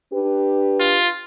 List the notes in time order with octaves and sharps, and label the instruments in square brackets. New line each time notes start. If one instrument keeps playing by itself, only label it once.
[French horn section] D4 G4 B4
[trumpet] F4